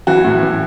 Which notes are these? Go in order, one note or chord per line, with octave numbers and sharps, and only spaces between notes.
E3 F#4
A2
E3